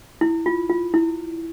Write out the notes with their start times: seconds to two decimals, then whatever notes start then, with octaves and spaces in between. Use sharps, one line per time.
0.21 E4
0.46 F4
0.69 F4
0.94 E4